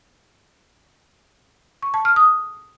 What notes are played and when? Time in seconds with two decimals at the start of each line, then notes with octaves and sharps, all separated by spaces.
1.82 C#6
1.94 A5
2.05 F6
2.16 D#6